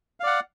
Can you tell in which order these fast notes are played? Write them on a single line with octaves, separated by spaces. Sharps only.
F5 D5 F#5